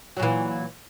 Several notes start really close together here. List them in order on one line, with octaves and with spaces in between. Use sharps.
F#3 A#2 E3